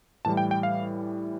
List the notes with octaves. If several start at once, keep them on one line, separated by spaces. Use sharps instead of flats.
A2 E3 G3 A5
G5
G5
F5